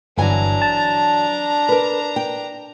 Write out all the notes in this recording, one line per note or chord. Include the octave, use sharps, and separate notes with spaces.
G1 E3 F#3 D4 G#5 A#5
A5
A#4 B4
G5